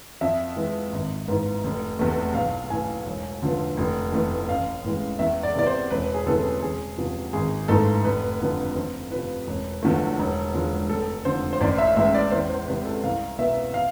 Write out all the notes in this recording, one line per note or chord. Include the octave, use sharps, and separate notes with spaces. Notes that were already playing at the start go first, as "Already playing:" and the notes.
F2 E5
E3 G#3 B3
G#1
G#2 E3 B3
F1
E2 C3 E3 A3
B1 F5
A2 E3 G#5
E1
D2 D3 F3 B3
F1
F2 E3 A3
A1 F5
A2 E3 G#3
E2 E5
D5
C3 E3 B3 D5
C5
E1 B4
G#4
D2 C3 E3 B3 A4
E1 G#4
E2 C3 F3
G#1 G#4
G#2 E3 A3 A4
F1 B4
F2 D3 F3 B3
F2 C5
C3 F3 B4
E1
E2 D3 F3 A3
E1
E2 D3 F3 G#3
F1 A4
F2 D3 F3 C5
C5
A1 D5
E5
A2 E3 G#3 E5
D5
E2 C5
C5
C3 E3 G#3 B3 B4
A4
C2 F5
B2 B3 E5
F5